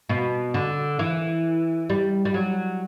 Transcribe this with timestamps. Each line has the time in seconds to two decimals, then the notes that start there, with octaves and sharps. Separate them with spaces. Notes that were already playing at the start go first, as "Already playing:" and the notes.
0.09 B2
0.54 D3
0.99 E3
1.90 G3
2.25 G3
2.34 F#3